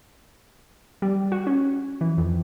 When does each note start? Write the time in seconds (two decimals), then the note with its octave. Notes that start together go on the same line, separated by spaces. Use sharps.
1.02 G3
1.32 F#4
1.47 C#4
2.01 E3
2.18 F2